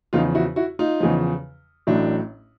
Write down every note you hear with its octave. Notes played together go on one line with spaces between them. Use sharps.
E2 C#3 F3 D#4 F4
E4 F#4
E4 F#4
D#4 F4
E2 C#3 F3
A1 A2 F#3 D4 E4